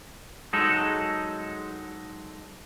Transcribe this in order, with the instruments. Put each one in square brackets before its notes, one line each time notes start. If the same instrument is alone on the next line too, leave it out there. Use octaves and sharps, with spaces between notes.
[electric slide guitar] F#3 G#3 D#4 A4